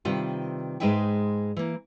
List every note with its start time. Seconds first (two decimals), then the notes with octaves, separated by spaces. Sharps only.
0.05 C3 D#3 G3 F4 B4
0.80 G#2 G#3 D#4 B4 E5 G5
1.57 E3 A#3